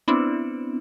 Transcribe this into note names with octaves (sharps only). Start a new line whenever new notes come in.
B3 C4 D4 E4